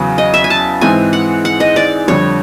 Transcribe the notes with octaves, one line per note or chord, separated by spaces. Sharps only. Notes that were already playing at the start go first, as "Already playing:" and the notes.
Already playing: E2 C#3 F#3 B3
D#5
E5
G#5
A5
G#2 E3 G#3 C4 G#5
F#5
F#5
D#5
D5
F2 D3 G3 C#5